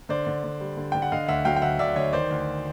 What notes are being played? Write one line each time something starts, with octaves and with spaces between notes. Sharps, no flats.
D3 C5 D5
D3
D3
G3
D3
D3 G5
F#5
D3 D#5 F5
D2 E5 F#5
F#3 F5 G5
G5
D2 E5 F#5
D2 D5 E5
D2 C#5 D#5
D#3 C5 D5
D2